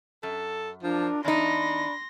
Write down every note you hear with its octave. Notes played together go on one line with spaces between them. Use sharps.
F#2 A4
F3 D4 F4 A#4
E2 D4 D#4 B5 C6 A#6